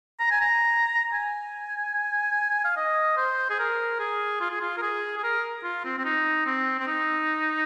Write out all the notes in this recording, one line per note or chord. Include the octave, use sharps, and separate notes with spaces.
A#5
G#5
A#5
G#5
F5
D#5
C5
G#4
A#4
G#4
F4
G#4
F4
A#4
G#4
G#4
A#4
F4
C4
C4
D#4
C4
C4
D#4